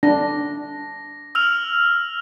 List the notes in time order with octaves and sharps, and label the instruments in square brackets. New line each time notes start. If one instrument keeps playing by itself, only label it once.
[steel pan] D4 [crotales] A#6
[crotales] E6 F6 F7